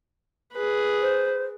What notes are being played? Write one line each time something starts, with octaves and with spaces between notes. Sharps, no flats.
G#4 B4
C5